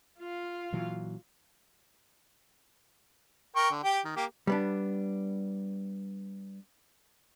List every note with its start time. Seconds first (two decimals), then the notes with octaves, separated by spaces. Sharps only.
0.19 F4 F5
0.73 A#2 E3 F#3
3.56 A#4 G5 C#6
3.71 D3
3.84 G4 G5
4.05 D#3
4.17 A#3 G4
4.47 G3 B3 D4